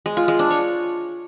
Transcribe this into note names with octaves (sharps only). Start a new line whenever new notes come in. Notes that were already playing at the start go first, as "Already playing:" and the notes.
G#3
F4
G#3
D4
C#5